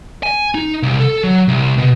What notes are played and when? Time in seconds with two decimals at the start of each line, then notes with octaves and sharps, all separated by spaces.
0.23 G#5
0.55 D#4
0.83 C2
1.00 A4
1.24 F#3
1.48 C2
1.78 B2